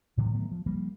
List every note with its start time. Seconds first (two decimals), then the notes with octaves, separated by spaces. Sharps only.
0.17 A2 D3 E3 F#3
0.33 D#3 F#3 A3 B3
0.51 F3
0.66 F3 G3 A#3